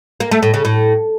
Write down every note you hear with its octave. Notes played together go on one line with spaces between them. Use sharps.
A#3
A3
A2
C#3
A2